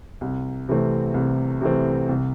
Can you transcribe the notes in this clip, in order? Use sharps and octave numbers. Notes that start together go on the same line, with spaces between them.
C2
C3 E3 A3 C4
C2
C3 E3 A3 C4
C2